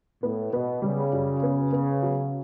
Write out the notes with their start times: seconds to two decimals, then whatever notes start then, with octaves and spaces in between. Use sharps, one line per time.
0.22 A2 B3
0.53 B2 B3
0.82 C#3 G3
1.13 F#2
1.43 B3
1.72 B3
2.03 F#3